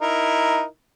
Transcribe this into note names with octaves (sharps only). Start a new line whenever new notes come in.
D#4 E4 A#4